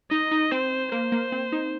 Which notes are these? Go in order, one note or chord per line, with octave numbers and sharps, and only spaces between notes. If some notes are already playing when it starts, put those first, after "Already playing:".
D#4 D#5
D#4
C4 C5
A#3 C5
A#3
C4
D#4